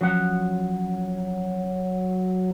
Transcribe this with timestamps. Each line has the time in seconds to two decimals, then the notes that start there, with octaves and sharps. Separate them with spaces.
0.01 F3 F#3 C#4 F#5